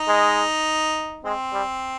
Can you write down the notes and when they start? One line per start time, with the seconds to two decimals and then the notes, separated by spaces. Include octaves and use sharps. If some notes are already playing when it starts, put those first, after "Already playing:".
Already playing: D#4
0.08 G#3
1.25 G#3 C4
1.53 G3